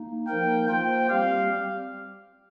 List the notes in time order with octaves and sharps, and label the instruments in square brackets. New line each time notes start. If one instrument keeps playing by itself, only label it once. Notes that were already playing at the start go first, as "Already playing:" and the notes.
Already playing: [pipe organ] A#3 D#4
[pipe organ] F3 A#3 D#4 A#4 [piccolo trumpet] G5
[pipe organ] A#3 F4 C5 [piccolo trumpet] G5
[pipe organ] G3 C4 G4 [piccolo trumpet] F5